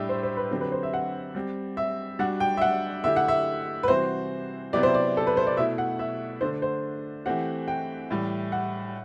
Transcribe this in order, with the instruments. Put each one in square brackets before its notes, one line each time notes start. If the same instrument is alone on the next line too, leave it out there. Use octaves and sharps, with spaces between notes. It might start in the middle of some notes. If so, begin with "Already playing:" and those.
Already playing: [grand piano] A2 G3 D4 G4 [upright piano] E5
[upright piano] C5
C5
B4
[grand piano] D3 F#3 C4 G4
[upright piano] B4
C5
E5
F#5
[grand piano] G3 C4 G4
[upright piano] E5
[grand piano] G3 D4 F#4 [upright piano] F#5
[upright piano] G5
E5
F#5
[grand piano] D3 A3 E4 G4 [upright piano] E5
[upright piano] F#5
E5
B4
[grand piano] C3 E3 G3 C4 F#4 [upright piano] C5
[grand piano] C3 F#3 B3 E4 G4 [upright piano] D5
[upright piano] C5
D5
A4
B4
C5
D5
[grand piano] B2 A3 E4 [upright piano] E5
[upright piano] F#5
E5
[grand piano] D3 A3 D4 [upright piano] C5
[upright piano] C5
[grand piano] E3 A3 C4 G4 [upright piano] F#5
[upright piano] G5
[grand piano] A2 E3 G3
[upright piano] F#5